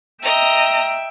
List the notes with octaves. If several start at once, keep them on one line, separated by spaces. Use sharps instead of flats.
D#5 E5 G5 A#5